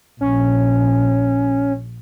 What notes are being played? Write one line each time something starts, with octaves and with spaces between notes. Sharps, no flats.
A#1 C#4